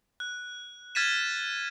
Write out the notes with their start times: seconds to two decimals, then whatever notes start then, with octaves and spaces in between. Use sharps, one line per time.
0.20 F#6
0.95 F6 G#6 A6 B6 D#7 E7